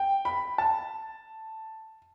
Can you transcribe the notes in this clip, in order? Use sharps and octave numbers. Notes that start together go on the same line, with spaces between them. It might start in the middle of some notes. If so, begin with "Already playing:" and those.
Already playing: G5
B5
A5